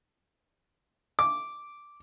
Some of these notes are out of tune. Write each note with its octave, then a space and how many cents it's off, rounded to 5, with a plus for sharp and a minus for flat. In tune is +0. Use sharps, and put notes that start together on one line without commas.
D6 -5